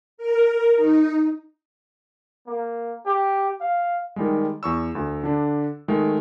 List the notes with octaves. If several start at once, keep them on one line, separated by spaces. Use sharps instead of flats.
A#4
D#4
A#3
G4
F5
D#3 G3 G#3
E2 C#6 E6
D2
D3 D4
D#3 G#3 A3